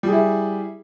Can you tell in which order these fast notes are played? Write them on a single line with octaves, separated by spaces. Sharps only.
G3 G#4 E4